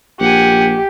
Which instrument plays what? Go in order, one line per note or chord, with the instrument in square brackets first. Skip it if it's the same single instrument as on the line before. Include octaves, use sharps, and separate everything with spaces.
[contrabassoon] A#1 [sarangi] G4 [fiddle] F#5 G#5